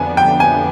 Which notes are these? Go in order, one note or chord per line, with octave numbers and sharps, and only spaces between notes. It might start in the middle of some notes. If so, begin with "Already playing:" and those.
Already playing: F2 D3 F3 B3 D4 G#5
G5
G#5